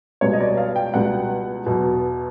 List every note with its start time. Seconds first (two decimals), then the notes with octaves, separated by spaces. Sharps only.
0.21 C#2 B2 G3 C#5
0.33 D#5
0.41 D5
0.57 F5
0.76 G5
0.94 C#2 B2 G3 F#5
1.66 E2 B2 F#3